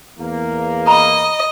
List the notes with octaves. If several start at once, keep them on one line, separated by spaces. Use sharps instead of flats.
E2 A#3
D#5 A#5 B5